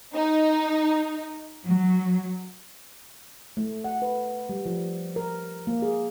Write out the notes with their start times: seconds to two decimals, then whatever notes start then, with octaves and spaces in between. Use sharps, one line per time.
0.14 D#4
1.66 F#3
3.57 A3
3.84 F#5
4.02 B4
4.49 G3
4.66 F3
5.16 A#4
5.67 A#3
5.82 G#4